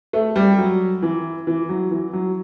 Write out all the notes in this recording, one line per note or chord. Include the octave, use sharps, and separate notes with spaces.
A3
G3
F#3
E3
E3
F#3
E3
F#3